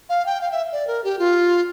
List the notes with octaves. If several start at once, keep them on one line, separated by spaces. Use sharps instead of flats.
F5
G5
F5
E5
D5
A#4
G4
F4